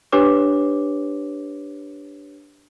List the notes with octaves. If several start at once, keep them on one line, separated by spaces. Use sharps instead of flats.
D4 G4 B4 C#5 D6